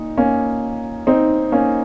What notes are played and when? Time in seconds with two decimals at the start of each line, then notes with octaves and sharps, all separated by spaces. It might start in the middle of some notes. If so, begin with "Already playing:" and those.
Already playing: A#2 D#4
0.17 A#3 C#4
1.07 C4 D#4
1.52 A#3 C#4